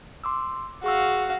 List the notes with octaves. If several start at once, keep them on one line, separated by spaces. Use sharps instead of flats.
C6 D6 E6
F#4 G#4 F5 C#6 E6